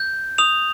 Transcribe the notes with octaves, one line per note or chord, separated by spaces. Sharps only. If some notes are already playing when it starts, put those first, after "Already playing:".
Already playing: G6
D#6 F7